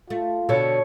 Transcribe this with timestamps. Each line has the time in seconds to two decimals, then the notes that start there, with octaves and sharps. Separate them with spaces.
0.10 A3 F4
0.49 B2 D3 B3 A4 C#5